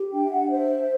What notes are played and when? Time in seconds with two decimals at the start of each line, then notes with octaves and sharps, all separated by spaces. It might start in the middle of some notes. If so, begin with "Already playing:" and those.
Already playing: G4
0.13 D4 G5
0.24 E5
0.32 F#5
0.51 C5 E5